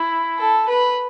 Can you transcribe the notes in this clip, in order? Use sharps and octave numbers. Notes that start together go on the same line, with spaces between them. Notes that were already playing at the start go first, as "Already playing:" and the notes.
Already playing: E4
A4
B4